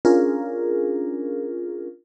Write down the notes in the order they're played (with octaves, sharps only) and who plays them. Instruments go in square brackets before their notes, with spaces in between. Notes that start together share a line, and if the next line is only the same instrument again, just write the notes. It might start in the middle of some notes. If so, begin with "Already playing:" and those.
[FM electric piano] C#4 D4 F4 G#4 A#4